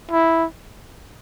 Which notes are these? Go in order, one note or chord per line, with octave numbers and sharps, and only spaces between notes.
E4